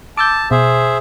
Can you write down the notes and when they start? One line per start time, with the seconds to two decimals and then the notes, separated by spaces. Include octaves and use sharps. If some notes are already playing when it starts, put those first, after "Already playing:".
0.17 A5 D6 E6 G6
0.51 B2 G#4 C5 E5